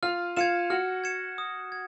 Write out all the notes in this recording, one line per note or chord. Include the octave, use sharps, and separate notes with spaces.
F4 F5 F6
F4 F5 G#6 C#7 E7
F#4 F#5 F6
G#6 C#7 E7
D#6
G#6